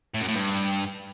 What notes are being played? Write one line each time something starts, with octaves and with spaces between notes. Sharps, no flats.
A2
F#2
A2
G2